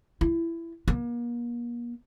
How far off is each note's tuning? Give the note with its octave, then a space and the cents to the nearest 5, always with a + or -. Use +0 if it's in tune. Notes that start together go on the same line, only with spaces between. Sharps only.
E4 +20
A#3 +40